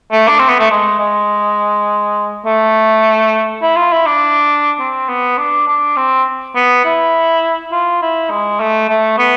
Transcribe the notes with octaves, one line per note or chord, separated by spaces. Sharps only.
A3
D4
C4
B3
A3
G#3
G#3
A3
E4
F4
E4
D4
C4
B3
D4
D4
C4
B3
E4
F4
E4
G#3
A3
A3
B3